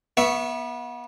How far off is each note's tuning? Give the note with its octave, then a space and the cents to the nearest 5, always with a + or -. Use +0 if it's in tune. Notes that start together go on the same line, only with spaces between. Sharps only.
B3 -30 E5 +0 C#6 +0